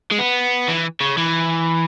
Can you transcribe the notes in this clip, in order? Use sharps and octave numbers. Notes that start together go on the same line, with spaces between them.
G#3
B3
E3
C#3
E3